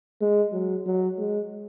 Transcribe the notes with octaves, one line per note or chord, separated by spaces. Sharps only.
G#3
F#3
F#3
G#3